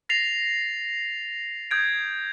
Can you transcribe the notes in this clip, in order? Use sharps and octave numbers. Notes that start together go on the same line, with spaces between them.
A6 A#6 C7 F7
D#6 G6 G#6 D7